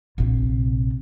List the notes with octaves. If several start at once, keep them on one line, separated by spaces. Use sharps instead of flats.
A#1 C3